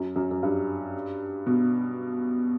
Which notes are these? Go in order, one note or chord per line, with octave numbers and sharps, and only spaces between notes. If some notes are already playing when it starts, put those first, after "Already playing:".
Already playing: F#2
F#2
F#2
G2
B2